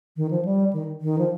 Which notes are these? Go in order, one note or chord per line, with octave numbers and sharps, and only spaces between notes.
D#3
F3
G3
D#3
D#3
F3